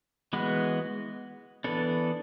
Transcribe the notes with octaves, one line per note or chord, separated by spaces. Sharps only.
E3 G#3 B3 F#4 B4
E3 B3 D4 A4